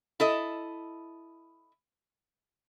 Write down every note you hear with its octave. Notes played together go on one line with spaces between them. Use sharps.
E4 A4 D#5